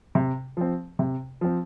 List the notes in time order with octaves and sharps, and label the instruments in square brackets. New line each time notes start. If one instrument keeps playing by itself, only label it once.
[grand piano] C3
F3 C4
C3
F3 C4